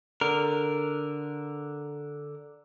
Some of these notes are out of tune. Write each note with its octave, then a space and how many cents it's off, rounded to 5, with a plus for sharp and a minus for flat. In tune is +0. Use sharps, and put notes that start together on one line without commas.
D3 +0 A#4 +0